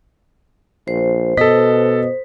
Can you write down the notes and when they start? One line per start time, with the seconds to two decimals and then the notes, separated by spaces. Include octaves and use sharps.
0.88 A#1 C5
1.37 B2 A4 D#5 B6